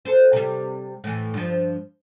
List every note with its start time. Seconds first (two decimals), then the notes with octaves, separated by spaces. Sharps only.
0.05 A4 C5
0.33 C3 G3
1.04 A2 E3
1.34 G2 F3